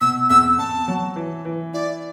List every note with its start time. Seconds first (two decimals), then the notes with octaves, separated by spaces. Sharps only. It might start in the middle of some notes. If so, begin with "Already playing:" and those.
0.01 B2 E6
0.30 E2 E6
0.58 E2 A5
0.88 F#3
1.16 E3
1.45 E3
1.74 E4 D5